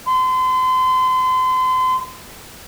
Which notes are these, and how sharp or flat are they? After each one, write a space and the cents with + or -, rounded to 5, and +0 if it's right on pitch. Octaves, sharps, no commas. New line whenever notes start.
C6 -35